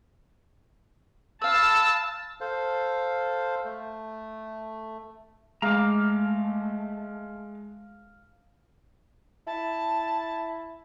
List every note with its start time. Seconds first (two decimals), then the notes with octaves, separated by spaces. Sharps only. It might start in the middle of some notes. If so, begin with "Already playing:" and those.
1.42 B4 F5 A5 E6
2.41 A4 C5 F5
3.65 A3
5.62 G#3 A3 F5 A#5 D6
9.47 E4 A5